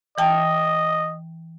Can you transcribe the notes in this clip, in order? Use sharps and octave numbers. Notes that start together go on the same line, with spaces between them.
E3 D#5 G5 A5